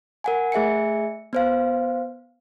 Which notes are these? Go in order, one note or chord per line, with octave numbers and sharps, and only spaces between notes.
A#4 F#5 G#5
A3 G#4 E5 G#5 C#7
B3 C5 F5